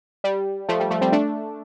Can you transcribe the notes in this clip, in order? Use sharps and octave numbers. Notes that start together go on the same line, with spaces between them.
G3
F3 A3
G3
F3 A3
G3 C4
A3 D4